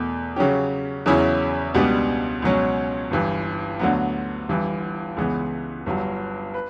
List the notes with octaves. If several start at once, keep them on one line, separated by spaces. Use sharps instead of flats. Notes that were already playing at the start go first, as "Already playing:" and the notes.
Already playing: E2 B2 A3
C#3 F#3 C#4 G4
E2 C#3 F#3 C#4 E4
C#2 B2 G3 B3 D4
C#2 B2 F#3 C#4
G1 G2 E3
D2 D3 F#3 B3
G1 G2 E3
C#2 C#3 E3 B3
G1 G2 F#3
B4